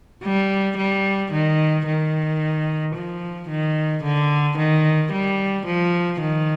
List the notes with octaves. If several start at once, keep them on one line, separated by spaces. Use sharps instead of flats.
G3
G3
D#3
D#3
F3
D#3
D3
D#3
G3
F3
D#3